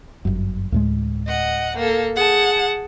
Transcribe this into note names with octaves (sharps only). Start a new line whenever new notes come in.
G1 F#2
D2 A2 G#3
D#5 F#5
A#3 A4
G#4 F#5 A5